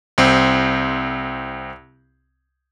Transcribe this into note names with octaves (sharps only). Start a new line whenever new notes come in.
C2 C4